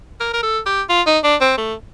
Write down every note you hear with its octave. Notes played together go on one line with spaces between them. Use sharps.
A#4
A#4
A4
G4
F4
D#4
D4
C4
A3